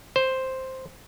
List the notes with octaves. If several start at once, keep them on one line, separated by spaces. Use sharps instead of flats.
C5